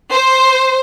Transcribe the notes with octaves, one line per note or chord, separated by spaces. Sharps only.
C5